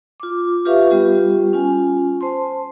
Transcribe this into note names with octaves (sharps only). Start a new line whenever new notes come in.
F4 D6
F4 G4 B4 E5 F5 C#6
G3 B3 F4 G4
C#4 F4 G#5
C5 A5 C6